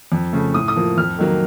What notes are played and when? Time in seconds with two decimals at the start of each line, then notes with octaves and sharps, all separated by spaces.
0.12 F2
0.33 C#3 A3
0.54 A2 D#6
0.68 D#6
0.76 F3 A#3
0.97 F2 F6
1.19 D#3 F#3 A#3